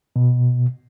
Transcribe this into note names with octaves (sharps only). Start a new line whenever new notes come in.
B2